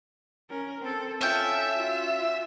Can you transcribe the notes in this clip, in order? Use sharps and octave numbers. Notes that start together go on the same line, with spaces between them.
C#4 A#4
C4 A4
C#4 F4 A4 E5 G5
F4 F#4